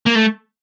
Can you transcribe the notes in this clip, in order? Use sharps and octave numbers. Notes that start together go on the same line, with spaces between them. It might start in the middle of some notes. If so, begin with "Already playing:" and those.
A#3
A3